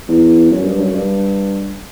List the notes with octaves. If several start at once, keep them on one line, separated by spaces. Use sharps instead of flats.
E2
F#2
G2
F#2
G2